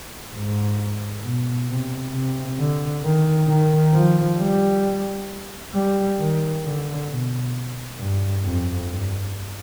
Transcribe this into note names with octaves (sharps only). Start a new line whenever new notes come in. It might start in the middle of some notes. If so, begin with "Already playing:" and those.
G#2
B2
C3
C3
D3
D#3
D#3
F3
G3
G3
D#3
D3
B2
G2
F2
G2